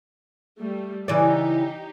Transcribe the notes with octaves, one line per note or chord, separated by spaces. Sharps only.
G3 A3
C#3 E3 D#4 G4 D5